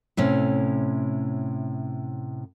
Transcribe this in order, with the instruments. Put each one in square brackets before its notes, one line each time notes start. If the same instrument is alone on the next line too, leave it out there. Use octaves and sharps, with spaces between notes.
[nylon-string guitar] A2 C3 C#4